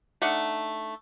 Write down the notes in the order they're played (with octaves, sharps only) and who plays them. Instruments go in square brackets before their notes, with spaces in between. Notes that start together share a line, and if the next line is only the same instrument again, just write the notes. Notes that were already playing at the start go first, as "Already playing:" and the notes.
[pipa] A3 D4 D#4 F#5